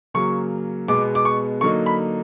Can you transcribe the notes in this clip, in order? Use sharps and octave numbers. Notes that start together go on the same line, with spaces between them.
C#3 F#3 A#3 C#6
B2 G#3 B3 D6
D6
C#6
D3 F#3 A#3 D#4 C#6
B5